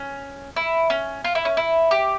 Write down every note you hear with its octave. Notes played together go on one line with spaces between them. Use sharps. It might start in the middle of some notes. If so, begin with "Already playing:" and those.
Already playing: C#4
E4
C#4
F4
E4
C#4
E4
G4